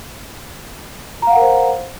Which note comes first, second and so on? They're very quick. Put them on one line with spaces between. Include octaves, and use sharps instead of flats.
A#5 F5 F#5 A#4 C5